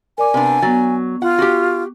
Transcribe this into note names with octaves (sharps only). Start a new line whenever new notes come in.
A#4 D5 G#5 D6
C3 B3 D4
F#3 B3 A6
F4 F#5
F#4 G4